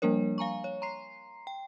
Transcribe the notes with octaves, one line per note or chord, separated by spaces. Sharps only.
F3 G3 A#3 D4 A#4 C#5
F5 G#5 A#5 C#6
C#5
A#5 C6 C7
G5